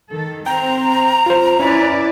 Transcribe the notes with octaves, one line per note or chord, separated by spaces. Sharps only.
D#3 A4
C4 G5 A#5
F4 C5
C#4 E4 B4 D5